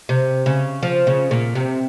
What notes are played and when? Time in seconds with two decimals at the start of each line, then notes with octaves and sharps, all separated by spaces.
0.09 C3
0.46 C#3
0.83 F3
1.07 C#3
1.31 A#2
1.55 C3